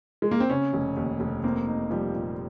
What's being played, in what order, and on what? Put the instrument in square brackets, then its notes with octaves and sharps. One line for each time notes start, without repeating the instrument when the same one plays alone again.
[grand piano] G#3
A#3
C4
[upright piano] C#3 [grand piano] C#4
[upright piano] F1
D#2
F1
[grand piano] A#3 [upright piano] C4
[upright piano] D#4
[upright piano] F3 [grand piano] G3
[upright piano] A#2